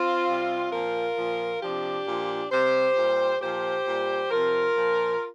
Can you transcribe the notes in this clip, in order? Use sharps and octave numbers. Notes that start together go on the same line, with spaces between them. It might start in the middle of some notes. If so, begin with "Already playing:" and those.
Already playing: C4 F4
C3 G3
A#2 F3 F4 A#4
A#2 F3
C3 F3 D4 G4
A#2 F3
C3 G3 G4 C5
A#2 G3
A#2 F3 G4 C5
A#2 G3
C3 F3 F4 A#4
A#2 F3